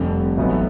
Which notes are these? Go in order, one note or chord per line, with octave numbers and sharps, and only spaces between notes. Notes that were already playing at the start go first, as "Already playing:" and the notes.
Already playing: F1 F2 D3 G3
A1 A2 F#3 B3 D#4